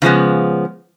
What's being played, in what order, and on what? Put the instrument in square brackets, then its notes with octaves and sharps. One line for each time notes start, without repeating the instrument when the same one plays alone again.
[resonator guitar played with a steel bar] C#3 F3 G#3 B3